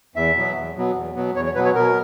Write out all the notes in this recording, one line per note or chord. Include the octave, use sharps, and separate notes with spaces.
E2 E5
B2 F#3 B3
E2
B2 F#3 B3
E2
B2 F#3 B3
E2 C#5
C#5
B2 F#3 B3 B4
C#5
B2 A#4